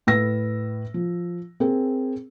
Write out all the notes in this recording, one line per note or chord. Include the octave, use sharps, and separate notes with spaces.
A2 B4 E6 A#6
F3
C4 G#4 A#4